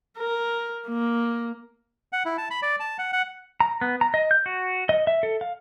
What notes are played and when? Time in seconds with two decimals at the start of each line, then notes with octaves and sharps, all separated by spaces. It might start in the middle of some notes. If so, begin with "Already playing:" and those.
0.18 A#4
0.88 A#3
2.13 F#5
2.25 E4
2.38 A5
2.51 B5
2.62 D5
2.80 A5
2.98 F#5
3.13 F#5
3.60 A#5
3.81 B3
4.01 A#5
4.14 D#5
4.31 G6
4.46 F#4
4.89 D#5
5.07 E5
5.23 A4
5.41 F5